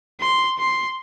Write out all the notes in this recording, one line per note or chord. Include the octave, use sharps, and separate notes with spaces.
C6
C6